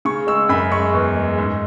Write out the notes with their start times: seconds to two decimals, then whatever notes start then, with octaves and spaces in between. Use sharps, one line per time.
0.05 C#3 C#6
0.27 G#3 E6
0.49 F#2 B5
0.72 G#3 C#6
0.94 E2
1.16 G#3
1.38 G#2